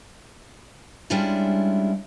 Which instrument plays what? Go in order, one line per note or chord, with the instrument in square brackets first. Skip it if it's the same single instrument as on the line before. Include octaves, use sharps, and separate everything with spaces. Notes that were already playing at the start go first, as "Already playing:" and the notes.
[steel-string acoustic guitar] G3 G#3 C#4 D4 E4 F4